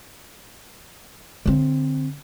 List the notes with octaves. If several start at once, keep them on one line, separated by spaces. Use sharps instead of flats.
D3 C4